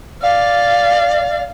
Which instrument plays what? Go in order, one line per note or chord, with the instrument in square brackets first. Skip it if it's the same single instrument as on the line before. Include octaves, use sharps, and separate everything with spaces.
[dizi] D5 [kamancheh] F5